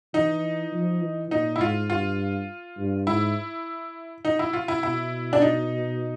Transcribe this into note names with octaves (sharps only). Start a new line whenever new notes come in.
E3 D#4
F3
E3
A#2 D#4
E4
G#2 F4
G2 F4
G2
G#2 E4
D#4
E4
F4
E4
B2 E4
D4
D#4